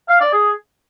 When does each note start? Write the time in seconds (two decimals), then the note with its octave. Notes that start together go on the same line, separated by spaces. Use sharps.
0.09 F5
0.21 D5
0.32 G#4